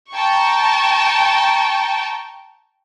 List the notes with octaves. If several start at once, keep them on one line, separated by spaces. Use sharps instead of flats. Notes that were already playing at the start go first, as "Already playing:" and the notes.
G5 A5 A#5 C#6